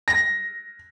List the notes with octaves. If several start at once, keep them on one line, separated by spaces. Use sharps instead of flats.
A#6